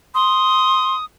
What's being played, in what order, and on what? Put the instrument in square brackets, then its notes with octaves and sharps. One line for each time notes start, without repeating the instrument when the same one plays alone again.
[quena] C6 [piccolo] D#6